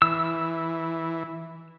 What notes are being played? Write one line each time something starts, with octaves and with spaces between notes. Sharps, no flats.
E3 E6